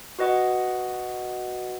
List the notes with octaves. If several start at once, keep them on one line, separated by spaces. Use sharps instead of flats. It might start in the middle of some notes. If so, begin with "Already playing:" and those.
F#4 B4 D#5 F#5